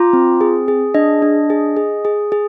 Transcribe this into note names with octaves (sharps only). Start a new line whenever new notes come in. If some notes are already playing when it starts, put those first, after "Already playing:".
Already playing: F4 A#5 D6
C4
G#4
G#4
D4 D#5
D4
G#4
G#4
G#4
G#4